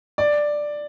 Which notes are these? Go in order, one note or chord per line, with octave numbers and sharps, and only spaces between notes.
D5